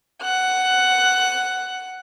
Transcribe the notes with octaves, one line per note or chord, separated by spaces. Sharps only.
F#5 F#6